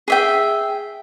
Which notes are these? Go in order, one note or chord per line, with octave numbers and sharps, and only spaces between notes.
G#4 E5 G5